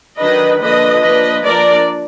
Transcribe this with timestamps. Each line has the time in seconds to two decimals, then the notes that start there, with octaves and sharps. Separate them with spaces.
0.19 D#3 F#3 D4 B4 D#5
0.61 D3 F3 A#3 D4 B4 D#5
1.02 F3 A#3 D4 B4 D#5
1.44 F3 A#3 D4 A#4 D5